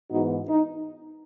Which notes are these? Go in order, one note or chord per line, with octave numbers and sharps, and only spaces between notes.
G#2 E3 B3 D#4 F#4
D#4